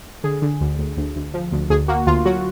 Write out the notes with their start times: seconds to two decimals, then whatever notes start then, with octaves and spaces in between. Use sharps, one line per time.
0.24 D3 G#4
0.42 D3
0.61 D2
0.79 D2
0.97 D2
1.16 D2
1.34 F3
1.52 D2
1.70 D2 G#4
1.88 A#3 F#4
2.07 D2 F4
2.25 F#3 F#4